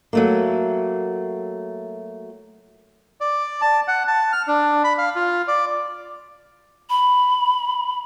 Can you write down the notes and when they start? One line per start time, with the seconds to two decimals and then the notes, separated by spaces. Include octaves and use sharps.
0.13 F#3 A3 A#3
3.21 D5
3.61 A5
3.88 F#5
4.08 A5
4.32 F6
4.47 D4
4.84 B5
4.98 F5
5.16 F4
5.48 D5
6.90 B5